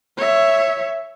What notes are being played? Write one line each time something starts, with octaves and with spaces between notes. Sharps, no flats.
C#5 E5